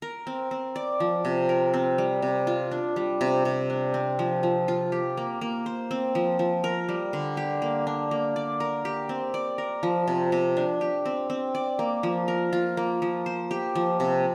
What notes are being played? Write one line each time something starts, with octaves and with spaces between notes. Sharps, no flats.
A#4
C4
C4
D5
F3
C3
A#4
C4
G3
C3
F4
D4
G3
C3
C3
D4
C4
F3
F3
F4
G4
A#3
A#3
C5
C4
F3
F3
A#4
G3
D3
G4
A#3
D4
A#3
D5
A#4
G4
C4
D5
A#4
F3
C3
C3
D4
G4
C4
C4
D5
A#3
F3
A#4
F4
A#3
F3
C5
G4
F3
C3